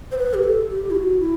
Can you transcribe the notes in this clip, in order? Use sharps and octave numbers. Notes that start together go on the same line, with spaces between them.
C5
B4
G4
A4
G4
E4
F#4
E4